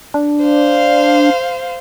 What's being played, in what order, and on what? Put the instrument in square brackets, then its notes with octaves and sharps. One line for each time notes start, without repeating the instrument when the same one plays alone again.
[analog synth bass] D4
[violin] C5 F5